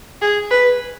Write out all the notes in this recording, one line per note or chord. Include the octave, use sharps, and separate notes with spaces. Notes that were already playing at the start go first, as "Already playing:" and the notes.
G#4
B4